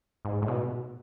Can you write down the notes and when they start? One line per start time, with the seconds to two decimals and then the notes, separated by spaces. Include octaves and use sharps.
0.25 G#2
0.42 A2
0.48 B2